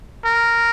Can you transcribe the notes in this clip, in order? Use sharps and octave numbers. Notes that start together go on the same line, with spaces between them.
A#4